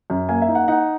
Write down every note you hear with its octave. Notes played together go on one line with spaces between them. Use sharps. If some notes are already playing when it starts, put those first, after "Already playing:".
F#2
A#3 G#5
E5
D#4
F#5
D#4 F#5